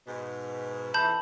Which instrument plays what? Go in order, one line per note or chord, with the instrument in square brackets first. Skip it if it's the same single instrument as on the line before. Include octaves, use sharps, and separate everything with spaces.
[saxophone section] G#2 B2
[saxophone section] F2 E3 [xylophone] A5 B5 G6